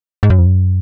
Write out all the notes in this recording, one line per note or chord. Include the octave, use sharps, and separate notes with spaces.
G#2
F#2
F2
F#2